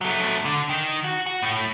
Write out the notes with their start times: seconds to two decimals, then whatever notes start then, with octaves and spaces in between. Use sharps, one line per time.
0.01 F#3 A3
0.45 D3
0.69 D#3
1.04 F#4
1.26 F#4
1.43 A2